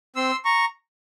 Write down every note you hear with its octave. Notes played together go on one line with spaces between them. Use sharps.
C4 C6 E6
A#5 C#6